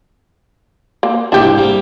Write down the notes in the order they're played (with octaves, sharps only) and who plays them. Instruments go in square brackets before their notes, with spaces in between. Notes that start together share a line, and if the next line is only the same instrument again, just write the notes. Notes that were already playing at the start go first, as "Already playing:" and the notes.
[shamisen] A#3
[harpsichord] C2 G#2 E4 [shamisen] D4 G4
[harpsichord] G3 A#3 C4